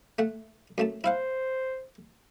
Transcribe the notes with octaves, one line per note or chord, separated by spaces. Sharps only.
A3 F#5
F#2 A3 A5
E4 C5 F5 F#5